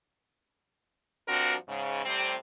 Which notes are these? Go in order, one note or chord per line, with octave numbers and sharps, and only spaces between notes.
G2 F3 C4 D4 F#4 A#4
G#2 C#3
A2 C3 G3 C4